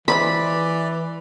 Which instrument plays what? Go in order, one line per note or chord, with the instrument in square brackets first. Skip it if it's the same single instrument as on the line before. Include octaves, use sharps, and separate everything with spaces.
[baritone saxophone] E3 [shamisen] G#3 B4 C5 [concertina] D5 [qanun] B5